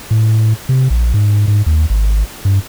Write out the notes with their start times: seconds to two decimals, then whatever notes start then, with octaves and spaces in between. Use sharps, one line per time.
0.11 A2
0.69 C3
0.90 A#1
1.14 G#2
1.48 G#2
1.66 D#2
1.90 G#1
2.45 G2